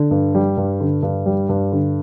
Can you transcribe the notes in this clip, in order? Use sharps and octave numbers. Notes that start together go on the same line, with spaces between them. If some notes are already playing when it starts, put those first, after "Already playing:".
Already playing: D3
G2
G3
G2
D3
G2
G3
G2
D3